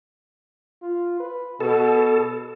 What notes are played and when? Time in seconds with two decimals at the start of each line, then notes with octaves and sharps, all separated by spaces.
0.82 F4
1.20 B4
1.60 B2 A4